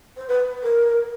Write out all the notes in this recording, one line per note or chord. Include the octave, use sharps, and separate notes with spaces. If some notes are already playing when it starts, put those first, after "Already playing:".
C5
B4
A#4